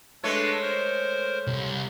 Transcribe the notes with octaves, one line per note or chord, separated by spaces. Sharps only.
G#3 A3 D4 A4 B4 C#5
A#4 C5
C2